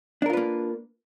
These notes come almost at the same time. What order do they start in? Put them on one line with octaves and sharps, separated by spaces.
D4 A#4 F4 B4 A#3